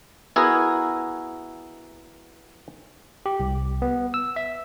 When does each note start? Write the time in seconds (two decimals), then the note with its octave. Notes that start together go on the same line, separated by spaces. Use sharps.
0.36 B3 E4 F#4 G#4 A#4
3.26 G4
3.40 C2
3.82 B3
4.14 E6
4.36 E5